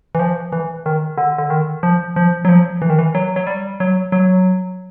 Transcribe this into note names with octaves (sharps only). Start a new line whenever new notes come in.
E3
F3
E3
D#3
D3
D3
D#3
F3
F3
F#3
F3
E3
D#3
E3
F#3
F#3
G3
F#3
F#3